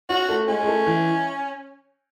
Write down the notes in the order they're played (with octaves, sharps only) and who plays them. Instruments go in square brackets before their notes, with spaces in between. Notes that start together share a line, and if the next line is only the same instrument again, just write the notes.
[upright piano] C#4 [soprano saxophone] F#4
[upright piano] A3
[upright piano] G#3 [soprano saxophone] C#4
[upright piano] G#3
A3
E3